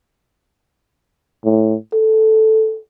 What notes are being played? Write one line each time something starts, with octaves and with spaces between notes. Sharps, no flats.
A2
A4